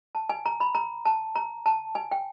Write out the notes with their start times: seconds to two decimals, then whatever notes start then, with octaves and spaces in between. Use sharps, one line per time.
0.15 A5
0.29 G#5
0.46 A#5
0.60 B5
0.75 A#5
1.05 A5
1.35 A#5
1.66 A5
1.95 G#5
2.11 G5